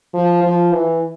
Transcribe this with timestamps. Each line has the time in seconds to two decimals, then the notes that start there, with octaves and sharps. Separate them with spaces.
0.14 F3
0.43 F3
0.72 E3